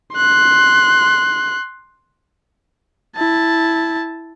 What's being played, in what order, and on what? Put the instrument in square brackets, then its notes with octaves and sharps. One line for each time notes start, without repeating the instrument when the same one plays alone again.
[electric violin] C6 F#6
E4 A5